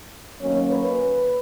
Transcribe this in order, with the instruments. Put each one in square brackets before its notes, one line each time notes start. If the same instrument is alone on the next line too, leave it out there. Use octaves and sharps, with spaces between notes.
[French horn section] D#3 F#3 A#3 C#4 C#5
B4